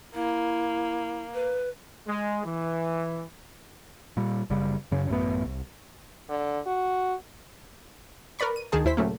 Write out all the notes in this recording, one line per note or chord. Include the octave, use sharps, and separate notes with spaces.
A#3 E4
B4
G#3
E3
A#2 G3
F#1 C#3 G3
F#2 C#3 C#4
A1 F#2 A3 B3
C2
D3
F#4
A#4 B4 D5 B5 C#6
D#7
D2 D#3 G#4 A5
D#2 E4 C5 B6
A#2 C#3 F#3 A3 A#3